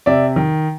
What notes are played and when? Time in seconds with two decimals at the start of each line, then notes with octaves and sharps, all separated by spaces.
0.06 C3 D5 E5
0.36 D#3